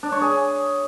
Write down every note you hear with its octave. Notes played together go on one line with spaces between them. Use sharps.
D4
C#5
G#4